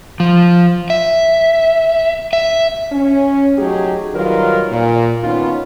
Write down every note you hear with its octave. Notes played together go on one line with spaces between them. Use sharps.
F3
E5
E5
C#4
F#3 A3 D#4 G4 G#4
D#3 F#3 G3 F4 A#4 B4
A#2
D#3 B3 C#4 D#4 F4